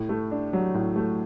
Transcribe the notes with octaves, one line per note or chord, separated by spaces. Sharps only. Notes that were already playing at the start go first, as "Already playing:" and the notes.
Already playing: A2
A3
D4
F#3
A2
A3